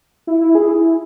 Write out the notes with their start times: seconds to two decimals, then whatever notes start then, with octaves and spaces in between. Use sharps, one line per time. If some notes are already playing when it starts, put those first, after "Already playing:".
0.27 E4
0.41 E4
0.55 G#4
0.68 E4